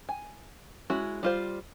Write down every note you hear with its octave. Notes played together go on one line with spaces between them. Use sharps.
G#5
G#3 C#4 E4 F#4
G3 F4 C5